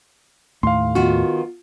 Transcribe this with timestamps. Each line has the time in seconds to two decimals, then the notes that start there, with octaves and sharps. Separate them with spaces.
0.63 D#2 A2 A3 F5 C6
0.95 D#3 B3 F4 F#4